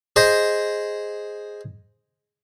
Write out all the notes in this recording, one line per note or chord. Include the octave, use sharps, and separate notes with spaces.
G#4 C5 D#5